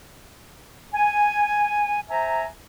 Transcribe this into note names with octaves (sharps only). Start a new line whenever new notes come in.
G#5
C5 E5 G#5 A#5